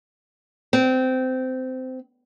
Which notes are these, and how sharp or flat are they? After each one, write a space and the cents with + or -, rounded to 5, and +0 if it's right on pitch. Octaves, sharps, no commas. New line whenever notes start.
C4 -20